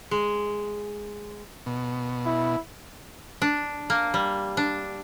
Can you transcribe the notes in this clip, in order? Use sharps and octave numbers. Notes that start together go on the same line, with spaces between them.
G#3
B2
E4
D4
A#3
G3
D4